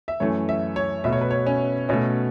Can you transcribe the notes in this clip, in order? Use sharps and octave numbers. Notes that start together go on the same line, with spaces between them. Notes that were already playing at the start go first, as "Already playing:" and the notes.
E5
F#2 E3 A3 C#5
E5
C#5
B2 A3 E5
C#5
B4
C#5
C#4
B2 A3 C#4